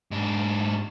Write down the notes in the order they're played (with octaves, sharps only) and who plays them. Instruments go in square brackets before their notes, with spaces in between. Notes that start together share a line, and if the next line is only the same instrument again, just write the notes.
[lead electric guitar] G#2 D4